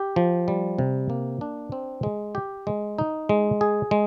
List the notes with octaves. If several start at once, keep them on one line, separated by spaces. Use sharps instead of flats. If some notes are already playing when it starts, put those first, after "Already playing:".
Already playing: G4
F3
G3
C3
A#3
D4
C4
G#3
G4
G#3
D#4
G#3
G#4
G#3